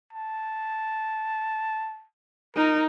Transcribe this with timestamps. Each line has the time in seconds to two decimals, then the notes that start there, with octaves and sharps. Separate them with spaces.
0.13 A5
2.56 D#4 A#4